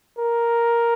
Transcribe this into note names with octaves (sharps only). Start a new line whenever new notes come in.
A#4